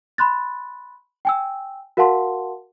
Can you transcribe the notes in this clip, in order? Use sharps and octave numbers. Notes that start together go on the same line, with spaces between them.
B5 C6 F#6 A6
G5 G#5 E6
F#4 A#4 F5 F#5 A5 C6